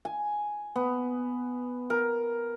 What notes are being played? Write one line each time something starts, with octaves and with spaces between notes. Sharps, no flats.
G#5
B3
A#4